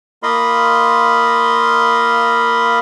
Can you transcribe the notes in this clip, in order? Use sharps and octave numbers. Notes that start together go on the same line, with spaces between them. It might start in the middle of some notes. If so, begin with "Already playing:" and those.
A#3 F4 D#5 F5 B5 C6